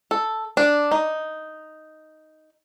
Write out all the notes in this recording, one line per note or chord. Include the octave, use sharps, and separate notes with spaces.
A4
D4
D#4